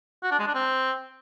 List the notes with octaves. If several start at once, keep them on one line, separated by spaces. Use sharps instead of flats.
F#4
D4
G#3
D4
C4